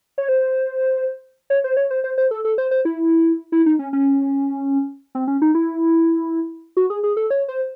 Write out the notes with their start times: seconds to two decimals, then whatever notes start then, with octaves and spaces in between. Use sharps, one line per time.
0.18 C#5
0.29 C5
1.50 C#5
1.64 C5
1.77 C#5
1.91 C5
2.04 C5
2.18 C5
2.31 A4
2.45 A4
2.58 C5
2.71 C5
2.85 E4
3.52 E4
3.66 D#4
3.79 C#4
3.93 C#4
5.15 C4
5.28 C#4
5.42 D#4
5.55 E4
6.77 F#4
6.90 G#4
7.04 G#4
7.17 A4
7.30 C#5
7.48 C5